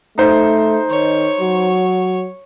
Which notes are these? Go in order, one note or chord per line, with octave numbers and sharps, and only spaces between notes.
A3 D#4 C5
D#3 C#5
F#3